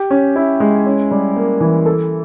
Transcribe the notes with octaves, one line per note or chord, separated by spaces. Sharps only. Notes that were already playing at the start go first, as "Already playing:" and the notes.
Already playing: G4
C#4
E4
G#3
C#4
G3
A#3
E3
A4